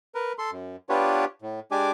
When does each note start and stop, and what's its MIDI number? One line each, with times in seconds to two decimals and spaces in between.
0.15 0.33 70
0.15 0.33 71
0.39 0.51 69
0.39 0.51 84
0.52 0.76 42
0.89 1.25 59
0.89 1.25 62
0.89 1.25 65
0.89 1.25 67
0.89 1.25 71
0.89 1.25 73
1.42 1.60 45
1.71 1.92 56
1.71 1.92 62
1.71 1.92 67
1.71 1.92 80
1.71 1.92 86